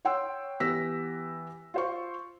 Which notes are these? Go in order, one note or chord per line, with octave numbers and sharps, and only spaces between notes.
C#5 F#5 G5 C6 E6
E3 B3 G4 E6 A#6 B6
F4 C5 C#6